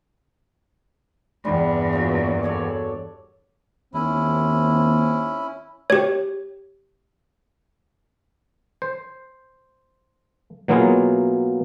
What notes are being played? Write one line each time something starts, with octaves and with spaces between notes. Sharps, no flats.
E2 G2 C3 G3 D4
A#2 F#3
A4 C#5 D5
D#2 C4 C#4 E4
G4 C#5
C5
B2 F#3 A#3 E4 F4 G#4